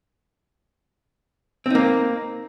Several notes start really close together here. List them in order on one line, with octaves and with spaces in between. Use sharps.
C4 D#4 A#3